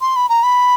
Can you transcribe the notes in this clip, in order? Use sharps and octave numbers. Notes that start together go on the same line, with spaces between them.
C6
B5
A#5
B5